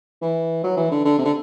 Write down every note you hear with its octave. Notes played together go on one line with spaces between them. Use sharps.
E3
F#3
E3
D3
D3
C3
D3